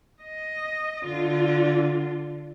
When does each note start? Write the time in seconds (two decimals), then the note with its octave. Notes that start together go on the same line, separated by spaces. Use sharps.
0.23 D#5
1.05 D3 F4